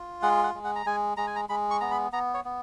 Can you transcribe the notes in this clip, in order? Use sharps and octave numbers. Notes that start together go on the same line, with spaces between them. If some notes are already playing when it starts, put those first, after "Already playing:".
Already playing: F4
G#3 F#5
F#5
G#3
F#5
A#5
G#3 G#5
G#3 A#5
G#5
A#5
G#3 B5
C#6
B3 A#5
B5
B3 A#5
C#5
B3